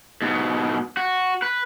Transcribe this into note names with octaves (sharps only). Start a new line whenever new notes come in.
G#2 B2
F#4
B4